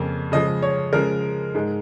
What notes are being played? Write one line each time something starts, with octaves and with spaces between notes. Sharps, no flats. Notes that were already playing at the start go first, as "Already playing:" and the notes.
Already playing: F2 C#3 A#3
C#3 F3 G#3 D#5
C#5
C#3 F3 G#3 A#4
G#2 G#3